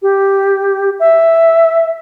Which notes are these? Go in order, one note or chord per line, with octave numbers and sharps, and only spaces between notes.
G4
E5